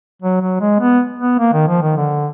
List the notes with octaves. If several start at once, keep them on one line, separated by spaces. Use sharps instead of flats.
F#3
F#3
G#3
B3
B3
A#3
D#3
F3
D#3
D3